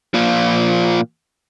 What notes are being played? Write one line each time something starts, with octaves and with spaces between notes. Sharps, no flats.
A#2 F3